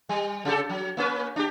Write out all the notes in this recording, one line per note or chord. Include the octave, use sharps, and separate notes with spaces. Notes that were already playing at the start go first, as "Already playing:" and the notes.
G3
C#3 G4 A4
F#3
A#3 C#4 B4
D4 G4